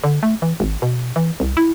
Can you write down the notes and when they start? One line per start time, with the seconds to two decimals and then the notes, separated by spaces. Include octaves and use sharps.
0.04 D3
0.23 A3
0.42 E3
0.60 G#1
0.82 B2
1.16 E3
1.40 C2
1.57 E4